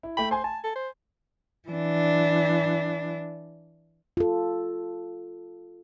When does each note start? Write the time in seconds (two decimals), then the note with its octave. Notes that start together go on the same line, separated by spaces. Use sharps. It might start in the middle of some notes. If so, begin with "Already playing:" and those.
0.03 E4
0.17 A3 A4 G5 B5
0.31 C5 G#5 C6
0.44 G#5 A5
0.64 A4
0.76 C5
1.69 E3 D4
4.17 F4 A4